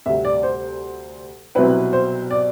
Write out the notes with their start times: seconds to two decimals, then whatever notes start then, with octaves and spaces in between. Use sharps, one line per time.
0.06 D2 C3 G3 E5
0.25 D5
0.43 C5
1.55 C2 B2 F#3 C4 E4 B4
1.93 C5
2.31 D5